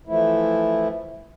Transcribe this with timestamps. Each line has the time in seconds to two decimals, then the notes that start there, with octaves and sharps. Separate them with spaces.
0.07 E3 F3 A3 E4